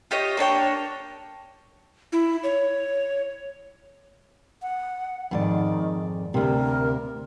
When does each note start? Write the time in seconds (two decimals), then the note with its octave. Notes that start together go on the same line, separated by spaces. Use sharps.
0.11 F4 G4 C#5 D#5
0.37 A#3 D4 C#5 G5
2.13 E4
2.44 C#5
4.62 F#5
5.31 F2 G#2 D#3 D5
6.34 D2 C3 A#4